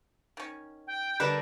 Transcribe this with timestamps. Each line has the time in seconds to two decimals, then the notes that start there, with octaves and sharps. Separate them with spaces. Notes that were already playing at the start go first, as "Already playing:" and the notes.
0.37 D#3 C#4
0.87 G5
1.20 D3 G3 A#4 B4 E7